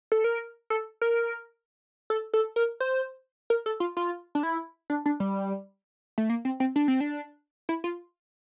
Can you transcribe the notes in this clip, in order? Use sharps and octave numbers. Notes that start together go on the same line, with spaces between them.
A4
A#4
A4
A#4
A4
A4
A#4
C5
A#4
A4
F4
F4
D4
E4
D4
D4
G3
A3
A#3
C4
C4
D4
C4
D4
E4
F4